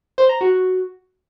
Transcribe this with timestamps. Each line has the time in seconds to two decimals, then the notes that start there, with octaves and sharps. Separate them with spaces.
0.18 C5
0.29 A#5
0.41 F#4